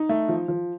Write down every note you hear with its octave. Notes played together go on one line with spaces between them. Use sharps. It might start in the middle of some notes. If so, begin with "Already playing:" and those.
Already playing: D#4
A3
F3
F3